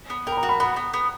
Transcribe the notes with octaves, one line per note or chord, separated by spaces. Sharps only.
B3
A#4 G5
B5
A#5
F#4
B5
B3 B5
B3
B3